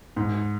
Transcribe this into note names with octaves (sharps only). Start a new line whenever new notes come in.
G#2